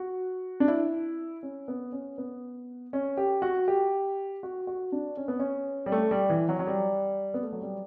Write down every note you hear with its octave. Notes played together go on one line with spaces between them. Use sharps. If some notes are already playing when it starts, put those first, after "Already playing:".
Already playing: F#4
D4
E4
C#4
B3
C#4
B3
C#4
G4
F#4
G4
F#4
F#4
D4
C#4
B3
C#4
G3
A3
G3
E3
F#3
F#3
G3
B3
A3
F#3
G3